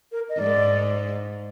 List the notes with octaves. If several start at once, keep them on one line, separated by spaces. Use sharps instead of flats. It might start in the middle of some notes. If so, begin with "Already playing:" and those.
A#4
D#5
G#2 D5